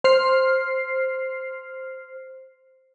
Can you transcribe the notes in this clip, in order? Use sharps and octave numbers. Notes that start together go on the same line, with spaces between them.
C5 F6 C7